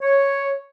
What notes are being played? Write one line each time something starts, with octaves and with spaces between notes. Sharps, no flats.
C#5